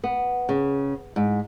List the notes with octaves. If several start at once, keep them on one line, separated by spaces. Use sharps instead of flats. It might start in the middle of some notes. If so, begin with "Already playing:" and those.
B3
C#3
G#2